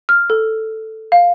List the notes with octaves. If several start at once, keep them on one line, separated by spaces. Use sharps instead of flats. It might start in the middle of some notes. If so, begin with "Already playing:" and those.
F6
A4
F5